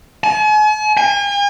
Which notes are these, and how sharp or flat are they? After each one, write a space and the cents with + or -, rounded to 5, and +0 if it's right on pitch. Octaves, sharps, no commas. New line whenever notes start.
G#5 +45
G#5 -45